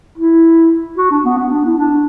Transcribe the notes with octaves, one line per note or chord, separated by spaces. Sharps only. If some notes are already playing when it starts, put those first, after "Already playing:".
E4
F#4
D4
B3
B3
D4
E4
D4